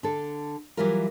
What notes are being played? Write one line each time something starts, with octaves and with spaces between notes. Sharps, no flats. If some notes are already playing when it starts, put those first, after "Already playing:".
D3 A4
E3 F#3 G3 E4 F4 A#4